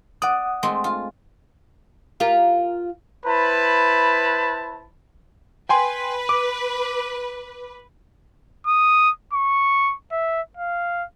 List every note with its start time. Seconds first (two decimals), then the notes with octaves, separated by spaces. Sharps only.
0.22 D5 F#5 D#6
0.63 G#3 A3 C4
0.84 F4
2.20 F4 G4 A#4
3.25 E4 B4 C5 A5 B5
5.69 B4 G5 G#5 C6
6.29 D6
8.67 D#6
9.33 C#6
10.11 E5
10.57 F5